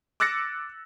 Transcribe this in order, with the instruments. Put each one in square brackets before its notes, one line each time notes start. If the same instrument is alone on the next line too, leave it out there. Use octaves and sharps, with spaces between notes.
[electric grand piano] D6 E6 F#6 A6 A#6 C#7